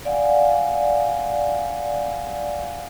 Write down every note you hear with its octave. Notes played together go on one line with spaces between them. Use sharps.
D5 F5 F#5 G#5